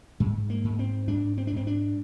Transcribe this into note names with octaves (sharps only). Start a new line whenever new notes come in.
G#2 G#3
A#3
G#2
C4
G#2 D4
C4
D4
G#2 C4
D4